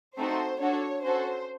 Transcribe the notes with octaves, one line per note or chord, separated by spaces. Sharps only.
A3 C4 D#4 F#4 A4 C5
D4 F#4 A4 C#5
C#4 F#4 A4 C5